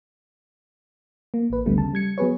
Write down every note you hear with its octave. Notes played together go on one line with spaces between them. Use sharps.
A#3
A1 B4
A1 D2 D3 G3 A3 B3
C#3 A5
G3 G#6 C#7
F#3 B3 G#4 B4 C#5